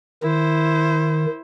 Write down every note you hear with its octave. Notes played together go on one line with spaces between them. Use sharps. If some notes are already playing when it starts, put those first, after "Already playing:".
D#3 E4 C5